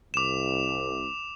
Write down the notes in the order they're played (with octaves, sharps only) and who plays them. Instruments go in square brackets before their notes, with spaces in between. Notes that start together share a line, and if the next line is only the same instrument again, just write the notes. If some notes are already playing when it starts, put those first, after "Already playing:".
[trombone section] C2 [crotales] D6 E7